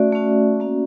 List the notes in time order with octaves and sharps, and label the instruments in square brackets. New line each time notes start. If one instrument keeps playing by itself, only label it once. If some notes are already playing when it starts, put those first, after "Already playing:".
Already playing: [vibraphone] A3 C#4 F#4 D5 E5
A3 C#4 F#4
A#3 C#4 F#4